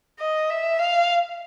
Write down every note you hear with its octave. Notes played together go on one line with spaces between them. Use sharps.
D#5
E5
F5